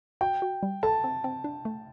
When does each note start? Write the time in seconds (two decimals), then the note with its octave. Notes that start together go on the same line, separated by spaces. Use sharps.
0.21 F#4 G5
0.42 F#4
0.63 G3
0.83 A4 A5
1.04 C4
1.24 C4
1.44 D4
1.65 A3